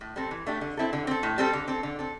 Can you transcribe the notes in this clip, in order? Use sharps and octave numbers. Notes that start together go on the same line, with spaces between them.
A2
G3 C4 A4
E3
A3 D4 G4
D3
C4 E4 A4
D3
C4 A4
A2
G3 C4 A4
D3
C4 A4
D3
C4 A4